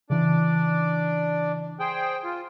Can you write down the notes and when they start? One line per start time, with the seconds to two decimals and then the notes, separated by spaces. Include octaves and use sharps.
0.10 C#3 E3 D4 D5
1.80 G#4 C5 G5
2.24 F4